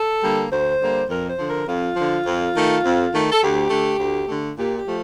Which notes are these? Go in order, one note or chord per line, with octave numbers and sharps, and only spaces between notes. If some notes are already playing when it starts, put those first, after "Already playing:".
Already playing: A4
D3 G3 A#3
D2 C5
D3 G3 A#3
F2 A#4
C5
D3 F3
A#4
F2 F4
D3 F3
F2
D#3 A3
F2
D#3 A3
A4
D2 G4
D3 A3
D2
D3 A3
A#2 G4
G4
F3 A3